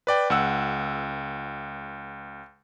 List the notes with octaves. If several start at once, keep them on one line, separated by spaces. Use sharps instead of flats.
B4 D5 G5
C#2 F#5 E6